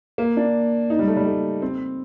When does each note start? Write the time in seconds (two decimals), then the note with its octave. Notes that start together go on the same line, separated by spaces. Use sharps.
0.18 A#3
0.37 D4
0.90 D#4
0.99 G3
1.08 A3
1.16 G3
1.25 A3
1.62 C4